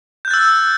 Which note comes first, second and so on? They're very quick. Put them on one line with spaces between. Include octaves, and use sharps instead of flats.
G6 F#6 A6 E6